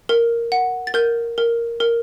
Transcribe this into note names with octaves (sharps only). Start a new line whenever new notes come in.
A#4
F#5
A6
A#4 G6
A#4
A#4